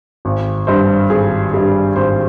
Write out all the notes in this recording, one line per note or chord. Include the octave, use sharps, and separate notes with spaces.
G#1
G2 G3 C5
G#1 G#4
G2 G3
G#1 C5